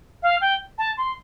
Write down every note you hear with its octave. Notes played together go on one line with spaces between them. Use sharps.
F5
G5
A5
C6